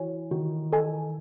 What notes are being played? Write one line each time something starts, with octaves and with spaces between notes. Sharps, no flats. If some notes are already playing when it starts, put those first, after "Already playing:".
Already playing: E3 F#4 C#5 G#5
D#3 F#4
A4 D#5 G#5